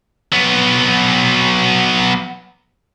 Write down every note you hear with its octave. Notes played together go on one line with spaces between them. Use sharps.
F#3 B3